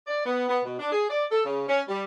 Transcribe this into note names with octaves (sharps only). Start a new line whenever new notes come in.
D5
B3
B3
B2
D4
G#4
D5
A4
C#3
C#4
G3